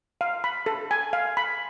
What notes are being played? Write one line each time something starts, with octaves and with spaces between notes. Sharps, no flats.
F5
B5
A4
G#5
F5
B5